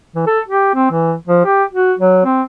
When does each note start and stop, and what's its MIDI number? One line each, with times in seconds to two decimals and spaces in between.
0.15 0.24 52
0.27 0.40 69
0.48 0.72 67
0.75 0.88 60
0.91 1.14 52
1.28 1.42 53
1.45 1.64 67
1.72 1.94 66
1.99 2.24 54
2.25 2.42 60